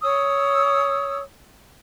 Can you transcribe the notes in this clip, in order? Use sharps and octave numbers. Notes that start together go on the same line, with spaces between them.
C#5 D#6 E6